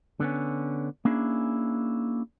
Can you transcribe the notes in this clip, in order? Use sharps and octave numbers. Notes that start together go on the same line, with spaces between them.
D3 B3 C#4
A#3 C#4 D4 E4 G#4